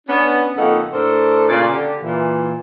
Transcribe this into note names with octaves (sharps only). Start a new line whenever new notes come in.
B3 C#4 D4
F2 C#3 A#3 D#4 A4 F#5
A2 A3 D4 A4 A#4 C5
A#2 C#3 D5
D3 G4
A#2 E3